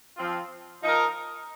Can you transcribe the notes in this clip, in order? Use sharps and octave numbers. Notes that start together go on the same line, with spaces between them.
F3 C4 F4
F3 D#4 A#4